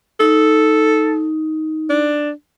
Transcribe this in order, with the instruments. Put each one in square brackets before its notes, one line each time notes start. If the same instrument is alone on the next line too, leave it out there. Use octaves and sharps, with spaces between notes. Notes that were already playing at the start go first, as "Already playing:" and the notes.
[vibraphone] D#4 [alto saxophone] A4
[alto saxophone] D4